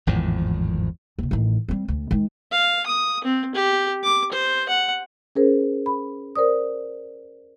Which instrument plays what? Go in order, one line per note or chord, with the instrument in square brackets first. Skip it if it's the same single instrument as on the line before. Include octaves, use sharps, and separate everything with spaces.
[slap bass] G#1 E2 A2 F3
[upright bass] D#2 C3
A1 D#3
G3 C4
D2
D#3 G#3
[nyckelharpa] F5
D#6
C4
G4
D6
C5
F#5
[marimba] C#4 G#4 A#4 C5
B5
A#4 C5 D5 D#6